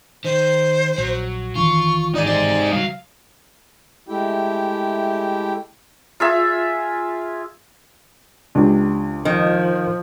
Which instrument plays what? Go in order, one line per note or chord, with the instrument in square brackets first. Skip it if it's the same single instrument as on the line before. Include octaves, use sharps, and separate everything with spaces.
[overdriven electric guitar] D#3 [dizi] C5
[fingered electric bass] A#1 [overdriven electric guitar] F#3
[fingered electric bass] F#1 D#3 E3 [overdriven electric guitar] F4 [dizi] C#6
[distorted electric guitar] D#4 G#4 [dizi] D5
[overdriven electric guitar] G4 C5 [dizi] D5
[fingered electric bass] C#3 G3 [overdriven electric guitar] F#3 [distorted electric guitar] F5
[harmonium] G#3 A3 E4 G4 G5
[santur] F4 G#4 E5
[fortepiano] C#2 D4 G4
[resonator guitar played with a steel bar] D#3 [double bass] F3